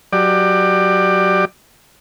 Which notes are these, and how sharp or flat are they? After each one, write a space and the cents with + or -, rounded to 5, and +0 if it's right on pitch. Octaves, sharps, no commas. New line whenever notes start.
F#3 +0 G4 +5 D5 +20